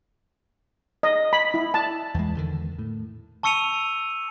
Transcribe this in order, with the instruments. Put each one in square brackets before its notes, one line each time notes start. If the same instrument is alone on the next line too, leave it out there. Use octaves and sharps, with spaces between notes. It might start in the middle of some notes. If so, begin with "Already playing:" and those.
[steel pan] D#5
B5
E4
A5
[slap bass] E2 G#3
E2 D3 D#3
A2
[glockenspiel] A5 C#6 E6 C#7 D#7 F7